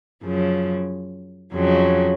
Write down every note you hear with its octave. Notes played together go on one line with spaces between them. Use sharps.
F#2 C#3 F3
F2 C#3 F#3